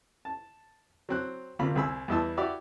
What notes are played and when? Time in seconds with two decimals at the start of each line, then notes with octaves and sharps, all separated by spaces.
0.25 A5
1.09 F#3 C4 F#6
1.59 D2 C3 A#3 F4 B5
1.75 C2 G#4 B5 E6
2.08 E2 G3 E4 D#5 A5 E6
2.37 E4 F#4 G4 D5 E5 B5